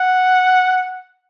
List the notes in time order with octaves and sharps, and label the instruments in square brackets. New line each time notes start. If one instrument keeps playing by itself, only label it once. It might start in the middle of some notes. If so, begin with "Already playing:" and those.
Already playing: [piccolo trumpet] F#5